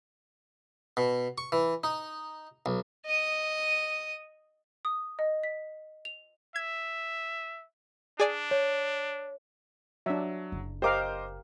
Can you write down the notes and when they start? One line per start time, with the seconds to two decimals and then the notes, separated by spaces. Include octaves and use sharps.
0.97 B2
1.38 C#6
1.52 E3
1.84 D#4
2.66 B1
3.06 D#5 D#6
4.85 D#6
5.19 D#5
5.44 B6
6.05 F7
6.56 E5 G#6
8.19 D4 G#4 D5 G#5
8.51 C#5
10.06 F#3 D4 E5
10.52 F#1
10.82 G4 A#4 C5 D#5 F5 D6